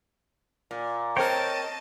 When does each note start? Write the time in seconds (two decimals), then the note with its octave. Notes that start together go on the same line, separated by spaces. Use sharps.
0.71 A#2
1.17 C4 A#4 C#5 D#5 G5 A5